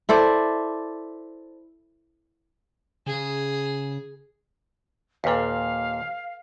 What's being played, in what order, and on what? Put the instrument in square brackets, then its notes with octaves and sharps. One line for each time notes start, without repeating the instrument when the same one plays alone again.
[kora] E4 A4 C5 D5
[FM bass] C#3 [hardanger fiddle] G#4
[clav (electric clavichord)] D#2 A#2 [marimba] A4 B4 [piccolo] F5